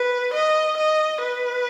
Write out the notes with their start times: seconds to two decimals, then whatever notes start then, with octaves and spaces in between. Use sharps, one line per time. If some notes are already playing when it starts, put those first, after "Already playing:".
Already playing: B4
0.33 D#5
0.77 D#5
1.20 B4